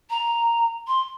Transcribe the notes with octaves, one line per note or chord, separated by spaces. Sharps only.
A#5
C6